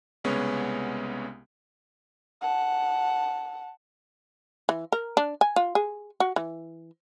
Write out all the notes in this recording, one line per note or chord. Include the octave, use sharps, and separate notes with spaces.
C2 C#3 G#3 B3 C#4 C#5
F#5 A5
E3
A#4
D4
G#5
F4
G#4
F#4
E3